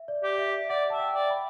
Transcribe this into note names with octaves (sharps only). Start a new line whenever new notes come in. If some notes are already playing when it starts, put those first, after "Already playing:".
Already playing: E5
D5
G4
E5
D5 F#5
E5 A5
G5
D5
B5